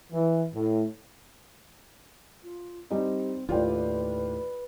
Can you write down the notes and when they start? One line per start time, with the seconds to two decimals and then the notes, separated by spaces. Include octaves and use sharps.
0.12 E3
0.54 A2
2.43 F4
2.91 G3 C4 D#4
3.49 D#2 A2 F4 B4 D5 G5